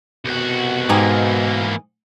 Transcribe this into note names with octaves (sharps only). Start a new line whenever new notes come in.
C2 B2 F#4
G#2 E3 A#3 D#4 G4 G#4